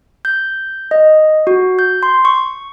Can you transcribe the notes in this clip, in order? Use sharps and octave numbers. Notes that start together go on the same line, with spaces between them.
G6
D#5
F#4
G6
C6
C#6